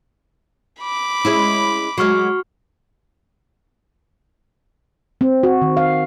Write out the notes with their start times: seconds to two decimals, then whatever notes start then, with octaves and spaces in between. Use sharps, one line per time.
0.80 B5 D6
1.25 G#3 C#4 E4
1.98 F#3 G#3 F#4 C#6 F6
5.21 C4
5.43 F#4
5.62 D#3
5.77 F5